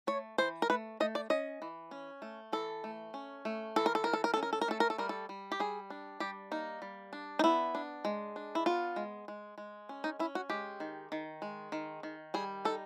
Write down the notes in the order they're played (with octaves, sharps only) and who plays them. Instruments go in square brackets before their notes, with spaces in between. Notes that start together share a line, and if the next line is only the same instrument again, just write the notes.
[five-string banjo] A3 C#5
E3 C5
A#4
A3 B4
A3 D#5
D5
C#4 D#5
E3
C#4
A3
E3 A4
A3
C#4
A3
E3 A4
A#4
A4
E3 A#4
A4
A#4
C#4 A4
A#4
A4
A#4
A3 A4
A#4
A4
G3 A#4
A4
G3
G4
G3 G#4
D4
G3 G4
A#3 D#4
G3
D4
D#4
B3 E4
D4
G#3
D4
E4
B3 F4
G#3
G#3
G#3
C#4
D#4
C#4 E4
F#4
G#3 G4
D#3
D#3
G#3
D#3
D#3
G3 G#4
D#4 A4